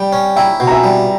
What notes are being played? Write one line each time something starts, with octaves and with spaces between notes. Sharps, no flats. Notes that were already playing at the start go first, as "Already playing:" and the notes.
Already playing: G3 G5
C#4
E4 G5 A#5
B2
A#5
E5 G#5
G3